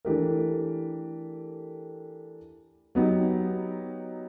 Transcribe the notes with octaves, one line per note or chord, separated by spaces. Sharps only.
E3 A3 D4 G4 A#4
F#3 B3 D#4 G4